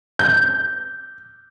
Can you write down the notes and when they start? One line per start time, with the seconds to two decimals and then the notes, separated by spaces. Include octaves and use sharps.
0.19 G6